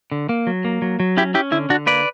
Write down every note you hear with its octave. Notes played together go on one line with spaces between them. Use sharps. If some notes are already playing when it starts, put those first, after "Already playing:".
D3
A#3
F#3
A#3
F#3
F#3
C#4 E4 G4
C#4 E4 G4
D3 E4
D3 D4 F#4
A#3 B4 D5